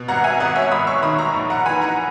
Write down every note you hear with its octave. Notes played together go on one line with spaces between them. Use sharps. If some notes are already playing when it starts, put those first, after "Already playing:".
Already playing: B2
G#1 F#5 A#5
E5 G#5
G#1 D#5 F#5
C#5 E5
G#1 B5 D#6
C#6 E6
D#3 B5 D#6
A#5 C#6
A#1
F#5 A#5
E3 G#5 B5
F#5 A#5